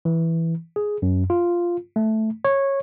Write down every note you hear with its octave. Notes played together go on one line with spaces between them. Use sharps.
E3
G#4
F#2
F4
A3
C#5